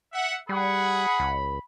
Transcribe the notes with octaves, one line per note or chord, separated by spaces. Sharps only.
E5 F#5
G3 G#4 F#5 B5
C#2